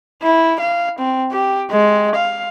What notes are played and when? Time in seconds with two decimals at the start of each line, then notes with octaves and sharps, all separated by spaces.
0.22 E4
0.60 F5
0.99 C4
1.32 G4
1.71 G#3
2.15 F5